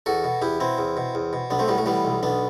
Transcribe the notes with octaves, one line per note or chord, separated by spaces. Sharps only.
E2 F#4 A4
B2
E2 E4 G4
B2 C4 E4
E2
B2
E2
B2
B1 B3 D4
A3 C4
A2 G3 B3
A3
E3 G3 B3
B1
B1 B3 D4